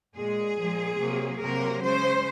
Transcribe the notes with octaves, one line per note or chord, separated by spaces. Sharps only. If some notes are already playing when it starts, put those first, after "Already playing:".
A#2 G#3 G#4
A#2 F3 G#3
C3 F#3 A#3
C3 F#3 A#3 A#4
C#3 G#3 C5